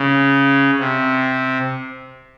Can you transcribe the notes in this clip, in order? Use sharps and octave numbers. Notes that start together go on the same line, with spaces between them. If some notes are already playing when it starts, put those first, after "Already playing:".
Already playing: C#3
C3